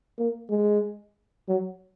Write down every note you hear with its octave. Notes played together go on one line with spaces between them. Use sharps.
A#3
G#3
F#3